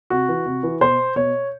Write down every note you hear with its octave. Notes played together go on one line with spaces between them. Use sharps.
C3 F#4
E3
C3
E3
B2 C5
B2 C#5